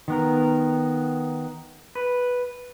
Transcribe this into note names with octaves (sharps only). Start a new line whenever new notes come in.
D#3 B3 A#4
B4